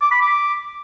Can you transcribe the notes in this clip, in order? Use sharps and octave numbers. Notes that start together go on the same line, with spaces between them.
D6
B5
D6